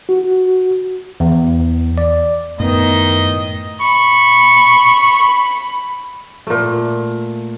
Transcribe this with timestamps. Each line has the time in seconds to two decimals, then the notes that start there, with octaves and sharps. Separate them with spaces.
0.09 F#4
1.20 E2
1.98 D5
2.60 F#2 A2 D#3 B3 D#5
3.81 B5 C#6
6.47 A#2 A3